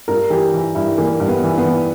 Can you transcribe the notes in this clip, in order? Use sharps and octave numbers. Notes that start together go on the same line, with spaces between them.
G2 A#4
E3 G4
E3
G2 E4
E3 A#3
G2
B3
E3
B3
E3